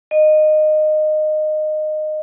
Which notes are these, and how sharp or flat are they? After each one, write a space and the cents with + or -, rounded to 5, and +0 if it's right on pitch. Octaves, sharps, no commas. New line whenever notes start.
D#5 -15